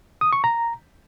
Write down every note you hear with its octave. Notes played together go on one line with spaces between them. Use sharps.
D#6
C#6
A#5